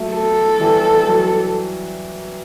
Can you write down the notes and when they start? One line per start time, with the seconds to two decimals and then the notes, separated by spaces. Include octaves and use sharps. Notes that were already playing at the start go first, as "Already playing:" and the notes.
Already playing: F#3 A3
0.12 A4
0.60 E3 G3
1.08 F#3